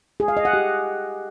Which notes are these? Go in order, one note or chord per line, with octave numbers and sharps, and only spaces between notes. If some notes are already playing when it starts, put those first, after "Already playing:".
G#4
F5
D#5
F#5
G4